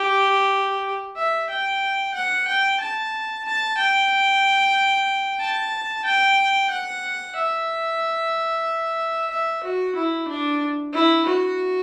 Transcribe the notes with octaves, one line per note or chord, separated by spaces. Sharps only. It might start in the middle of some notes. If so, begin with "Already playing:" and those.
Already playing: G4
E5
G5
F#5
G5
A5
A5
G5
A5
G5
F#5
E5
E5
F#4
E4
D4
E4
F#4